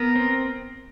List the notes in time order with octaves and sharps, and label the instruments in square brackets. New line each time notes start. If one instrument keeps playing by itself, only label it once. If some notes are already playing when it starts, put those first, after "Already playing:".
Already playing: [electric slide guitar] B3 [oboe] A#4
[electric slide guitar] C4